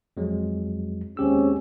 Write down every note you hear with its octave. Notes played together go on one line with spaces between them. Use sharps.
F2 F#3 G#3
D#2 G#3 C4 C#4 G4 E6